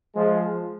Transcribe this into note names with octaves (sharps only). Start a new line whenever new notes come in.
F3 G#3